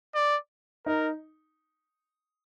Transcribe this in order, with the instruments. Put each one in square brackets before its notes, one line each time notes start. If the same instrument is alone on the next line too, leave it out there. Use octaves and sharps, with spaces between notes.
[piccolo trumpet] D5
[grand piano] D#4 [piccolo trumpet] A#4